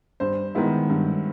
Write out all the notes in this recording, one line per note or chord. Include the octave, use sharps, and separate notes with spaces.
G2 C5
D#3 G#3 B3 E4
G2